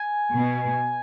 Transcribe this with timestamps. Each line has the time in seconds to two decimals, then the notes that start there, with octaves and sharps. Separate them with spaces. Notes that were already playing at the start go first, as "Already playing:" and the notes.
Already playing: G#5
0.33 B2